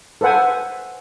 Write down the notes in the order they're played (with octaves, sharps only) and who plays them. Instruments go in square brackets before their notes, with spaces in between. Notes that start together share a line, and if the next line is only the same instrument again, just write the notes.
[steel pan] A4 B4 C5 F#5 G#5